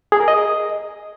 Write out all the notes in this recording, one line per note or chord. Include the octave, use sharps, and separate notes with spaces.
G#4
A#4
D#5